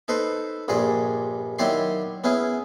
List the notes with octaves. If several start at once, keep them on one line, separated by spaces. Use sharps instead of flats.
D#4 A4 B4 C5
A#1 G2 G#4 D5
D#3 F#3 E4 G4 D5 C6
B3 C#4 E4 G#4